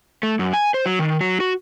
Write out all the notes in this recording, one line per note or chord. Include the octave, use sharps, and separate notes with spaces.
A3
F#2
G#5
C5
F#3
D#3
F#3
F#4